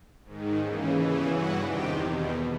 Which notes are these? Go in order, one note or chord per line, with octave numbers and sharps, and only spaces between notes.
G#2 D#3
D#2 C#3 E3
E2 C#3 E3
G2 E3 F#4 F#5
E2 C3 D#3 G4 G5
E2 B2